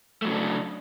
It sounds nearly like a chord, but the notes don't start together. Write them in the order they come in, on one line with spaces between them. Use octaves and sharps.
A3 F#3 C#3 D4